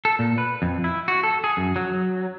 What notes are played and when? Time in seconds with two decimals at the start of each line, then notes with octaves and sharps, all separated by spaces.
0.05 A4
0.19 A#2
0.38 B4
0.62 F2
0.84 E4
1.08 F#4
1.23 A4
1.44 G#4
1.57 F#2
1.76 F#3